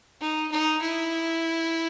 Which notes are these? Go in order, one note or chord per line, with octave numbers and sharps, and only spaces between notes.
D#4
D#4
E4